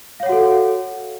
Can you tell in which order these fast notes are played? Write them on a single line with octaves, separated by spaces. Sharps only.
F5 C#5 F#5 F#4 A4